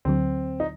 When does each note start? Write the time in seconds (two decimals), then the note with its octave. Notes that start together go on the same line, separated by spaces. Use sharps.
0.05 D2 D3 F#3 C4
0.60 D#4